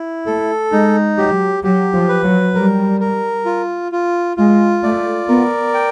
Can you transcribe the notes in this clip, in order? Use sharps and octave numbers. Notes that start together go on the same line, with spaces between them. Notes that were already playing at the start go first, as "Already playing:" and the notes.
Already playing: E4
A3 A4
G#3 D#4
F#3 G4
F#3 G4
F3
B4
F#3
G3 A#4
A#4
F4
F4
G#3 F4
A3 D5
B3 A#4
G5